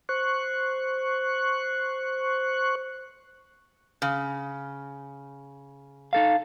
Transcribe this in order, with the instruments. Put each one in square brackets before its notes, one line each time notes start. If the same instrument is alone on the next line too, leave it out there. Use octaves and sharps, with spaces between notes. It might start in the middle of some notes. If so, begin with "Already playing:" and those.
[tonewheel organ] C5 C#6 F#6
[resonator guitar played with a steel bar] C#3
[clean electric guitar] D#4 A4 F5